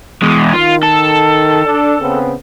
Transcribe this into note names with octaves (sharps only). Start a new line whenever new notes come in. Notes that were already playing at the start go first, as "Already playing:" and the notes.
E2 G#3
D#3 F4
A4
D4
C#3 B3 C4